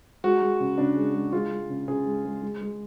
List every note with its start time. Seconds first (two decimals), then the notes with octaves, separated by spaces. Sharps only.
0.24 G#3 F#4
0.42 G#3
0.60 C#3
0.78 C#3 D4
0.97 G#3
1.14 G#3
1.32 G#3 F4
1.51 G#3
1.69 C#3
1.88 C#3 G#4
2.06 G#3
2.25 G#3
2.42 G#3
2.62 G#3